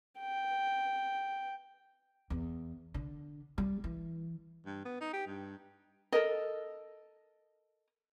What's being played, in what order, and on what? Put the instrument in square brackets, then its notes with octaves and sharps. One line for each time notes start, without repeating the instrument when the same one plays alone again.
[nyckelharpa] G5
[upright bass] E2
D3
G3
E3
[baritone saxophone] G2
B3
D#4
G4
G2
[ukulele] A4 A#4 D#5